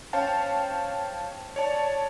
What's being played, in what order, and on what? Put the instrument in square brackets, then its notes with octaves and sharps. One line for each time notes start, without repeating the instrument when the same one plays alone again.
[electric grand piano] C#4 C5 C#5 F5 G5 A5
C#5 D5 A5